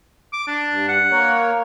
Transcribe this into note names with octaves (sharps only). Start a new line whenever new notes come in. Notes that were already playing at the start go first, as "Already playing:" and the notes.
D6
D4
G2
F#5
A#3 A#4 C#5